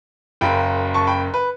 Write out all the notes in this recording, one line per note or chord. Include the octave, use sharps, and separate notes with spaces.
F#1 F#2 C#3 G5 B5
A5 C#6
G5 B5
B4